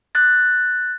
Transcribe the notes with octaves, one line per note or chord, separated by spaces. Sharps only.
F#6 A6